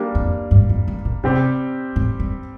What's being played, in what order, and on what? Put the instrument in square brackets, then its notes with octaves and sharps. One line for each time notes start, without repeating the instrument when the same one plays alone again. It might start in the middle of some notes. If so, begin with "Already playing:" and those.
Already playing: [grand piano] G3 A#3 D4
[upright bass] F2
G2
F2
G2
A#2
[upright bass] C3 [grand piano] G3 C4 G4
[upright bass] A2
G2